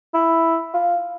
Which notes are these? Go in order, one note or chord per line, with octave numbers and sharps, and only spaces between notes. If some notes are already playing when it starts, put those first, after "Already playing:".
E4
F4